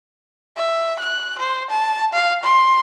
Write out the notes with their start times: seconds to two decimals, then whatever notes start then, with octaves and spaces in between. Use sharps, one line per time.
0.57 E5
0.99 F#6
1.39 C5
1.70 A5
2.13 F5
2.43 C6